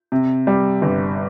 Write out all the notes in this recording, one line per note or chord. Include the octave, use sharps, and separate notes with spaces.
C3
G3
G1